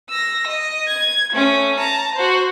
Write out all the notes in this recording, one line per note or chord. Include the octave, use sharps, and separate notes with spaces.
E6 A#6
D#5
G#6
A3 C#4
A5 A#5
F#4 C5